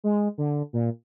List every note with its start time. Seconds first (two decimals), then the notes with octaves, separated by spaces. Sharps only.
0.04 G#3
0.38 D3
0.73 A#2